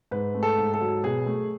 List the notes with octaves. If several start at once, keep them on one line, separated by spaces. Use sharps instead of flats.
G#2 B4
A3
A4
G#2
A4
F#3
B2 G#4
A3